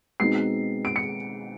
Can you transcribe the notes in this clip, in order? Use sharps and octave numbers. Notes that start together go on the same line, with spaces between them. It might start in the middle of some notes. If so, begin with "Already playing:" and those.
B2 G#3 C4 D#4 C7
D7
C#7